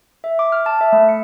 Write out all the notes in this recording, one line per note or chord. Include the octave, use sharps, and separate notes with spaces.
E5
D6
F6
A5
E5
A3
C#7